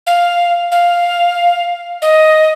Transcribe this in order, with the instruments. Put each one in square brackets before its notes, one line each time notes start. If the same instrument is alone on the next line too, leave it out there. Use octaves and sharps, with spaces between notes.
[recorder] F5
F5
D#5